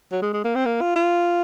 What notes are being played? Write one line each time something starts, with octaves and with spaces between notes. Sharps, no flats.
F#3
G#3
G#3
A#3
C4
A#3
F4
F4